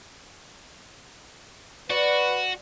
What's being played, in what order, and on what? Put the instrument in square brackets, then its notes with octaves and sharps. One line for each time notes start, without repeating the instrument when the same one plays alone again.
[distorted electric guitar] F#4 [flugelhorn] B4 [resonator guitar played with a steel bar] D5